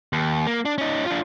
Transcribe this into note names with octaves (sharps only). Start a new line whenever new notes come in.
D#2
A#3
D4
C#4 D#4
D4 F4